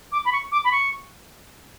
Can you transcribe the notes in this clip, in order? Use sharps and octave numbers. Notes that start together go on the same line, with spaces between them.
D6
B5
C#6
D6
B5
C#6